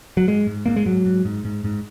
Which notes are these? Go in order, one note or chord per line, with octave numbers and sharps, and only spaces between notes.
F#3
G#2 G#3
G#2
G#2 A#3
G#3
G#2 F#3
G#2
G#2
G#2
G#2